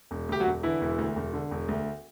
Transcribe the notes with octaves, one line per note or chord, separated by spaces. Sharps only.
E1
D2 G4
F#3 F#4
E1
D3 E3 E4
E1
D2
E1
D3
E1
D2